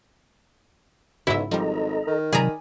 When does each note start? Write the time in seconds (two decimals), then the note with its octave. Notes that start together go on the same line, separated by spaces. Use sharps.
1.27 B1 G#2 C#3 E4 F#4 E5
1.51 G#1 F3 G3 A4 D#5 A#5
2.07 D#3
2.33 C3 F#3 G#4 D5 A#5 B5 D#6